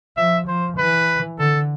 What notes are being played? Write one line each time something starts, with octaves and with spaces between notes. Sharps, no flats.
F3 E5
F3 C5
E3 B4
D3 A4